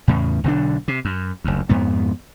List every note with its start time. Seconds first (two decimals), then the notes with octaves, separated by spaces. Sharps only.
0.08 E2 A2 C#3
0.44 B1 D3 F#3 D4
0.88 C3
1.05 F#2
1.44 F#1 D2
1.69 F2 G#2 B3